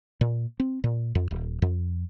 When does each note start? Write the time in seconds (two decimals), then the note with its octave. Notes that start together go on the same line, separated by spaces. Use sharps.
0.21 A#2
0.60 C4
0.84 A#2
1.15 F2
1.31 D#1
1.62 F2